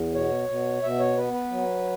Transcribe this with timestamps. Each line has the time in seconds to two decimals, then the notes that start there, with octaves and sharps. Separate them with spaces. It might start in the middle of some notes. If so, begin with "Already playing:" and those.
Already playing: E2
0.14 B2 C#5
0.49 B2
0.82 B2 E5
1.00 C#5
1.17 B3 B4
1.33 B4
1.51 F#3